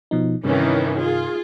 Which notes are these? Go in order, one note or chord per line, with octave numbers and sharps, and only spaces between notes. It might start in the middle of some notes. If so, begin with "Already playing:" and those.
B2 F3 D#4
G2 C3 D#3 E3 C#4
F4 G#4